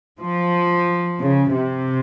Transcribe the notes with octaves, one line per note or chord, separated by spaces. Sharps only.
F3
C#3
C3